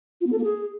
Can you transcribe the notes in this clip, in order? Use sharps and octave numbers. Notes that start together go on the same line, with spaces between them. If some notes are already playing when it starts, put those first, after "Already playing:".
F4
B3
A4
A#3
G#4